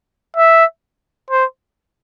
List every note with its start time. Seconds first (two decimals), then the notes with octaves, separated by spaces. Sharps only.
0.37 E5
1.30 C5